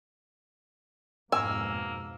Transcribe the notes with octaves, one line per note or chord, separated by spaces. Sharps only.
F2 G#2 B2 A#3 G#5 E6